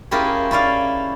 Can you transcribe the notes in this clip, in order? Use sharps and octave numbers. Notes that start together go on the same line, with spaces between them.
C#4 E4 F4 G4 G#4 A#4
C#4 E4 D5 F5